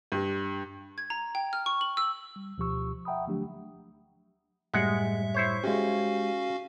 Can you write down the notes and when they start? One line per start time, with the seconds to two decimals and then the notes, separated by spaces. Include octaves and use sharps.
0.12 G2
0.98 G#6
1.10 A#5
1.35 G5
1.53 F6
1.66 C#6
1.81 F#7
1.97 E6
2.36 G3
2.58 D2 B2 F3 G4 C#6 E6
3.05 E5 F#5 G5 A#5 B5 D#6
3.27 D3 F3 F#3 A3 D4 G4
4.74 F#2 A2 G3 G#3 E5 F#5
5.34 E4 C5 C#5
5.64 G#3 C#4 F#4 G4 F5